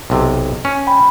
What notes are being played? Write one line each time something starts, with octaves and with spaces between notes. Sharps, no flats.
B1 C3
C#4
G5 B5